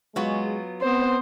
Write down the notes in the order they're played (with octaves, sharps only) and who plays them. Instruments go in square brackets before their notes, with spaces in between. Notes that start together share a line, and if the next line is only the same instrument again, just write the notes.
[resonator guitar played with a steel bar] F#3 B3 F4 [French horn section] G#3
[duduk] B3 [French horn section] C4 B4 [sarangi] C5